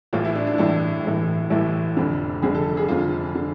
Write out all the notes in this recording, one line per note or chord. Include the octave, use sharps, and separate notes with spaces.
A1 A2 E3 F4
E4
D4
D4
E4
A1 A2 E3 D4
A1 A2 E3
A1 A2 E3 E4
F1 F2 D3
F1 F2 D3 G#4
A4
G#4
F1 F2 D3 F4
D3